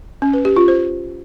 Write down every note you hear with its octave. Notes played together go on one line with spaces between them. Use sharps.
C#4
B4
G4
F4
C5